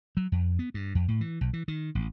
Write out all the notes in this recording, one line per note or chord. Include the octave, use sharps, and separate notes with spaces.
F#3
F2
B3
G2
F2
A2
E3
B1
E3
D#3
A1